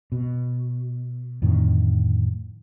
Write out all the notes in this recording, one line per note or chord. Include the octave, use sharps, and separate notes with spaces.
B2
F2 A2 D3 D#3